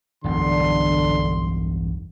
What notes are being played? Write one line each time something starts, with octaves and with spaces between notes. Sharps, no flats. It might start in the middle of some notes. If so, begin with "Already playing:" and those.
E1 B1 G2 D3 C6